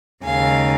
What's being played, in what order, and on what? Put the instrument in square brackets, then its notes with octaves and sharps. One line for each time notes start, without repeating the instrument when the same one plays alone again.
[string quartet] D#2 C#3 G#3 D#4 F5 G#5